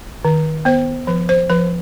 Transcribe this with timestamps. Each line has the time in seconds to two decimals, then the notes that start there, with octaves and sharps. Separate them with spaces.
0.25 D#3
0.65 B3 C5
1.07 F3 B4
1.29 C5
1.50 F3 B4